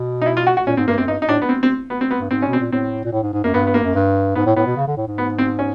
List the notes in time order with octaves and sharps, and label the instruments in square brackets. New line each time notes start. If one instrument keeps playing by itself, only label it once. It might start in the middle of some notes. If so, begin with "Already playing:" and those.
Already playing: [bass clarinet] B2
[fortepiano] D#4
E4
F4
F#4
F#4
[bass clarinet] A#2 [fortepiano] C#4
[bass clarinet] G#2 [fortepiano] C4
[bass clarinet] G2 [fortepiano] A#3
[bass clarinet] F#2 [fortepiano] C4
[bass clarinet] G2 [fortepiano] D#4
[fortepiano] D#4
[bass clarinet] A2 [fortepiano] D4
[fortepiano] B3
C4
C4
B3
C4
B3
[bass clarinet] G2
[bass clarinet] G#2 [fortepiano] C4
[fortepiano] C#4
[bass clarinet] B2
[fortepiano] C4
[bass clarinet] A#2
[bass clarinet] A2 [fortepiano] C4
[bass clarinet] A#2
A2
G#2
G#2
[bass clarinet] F#2 [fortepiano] A#3
[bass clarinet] G2 [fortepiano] B3
[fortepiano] B3
A#3
[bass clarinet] F#2
G2
[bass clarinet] G#2 [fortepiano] B3
[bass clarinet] A2
[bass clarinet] A2 [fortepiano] B3
[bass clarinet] B2
C#3
D3
A2
G#2
[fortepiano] B3
C4
C#4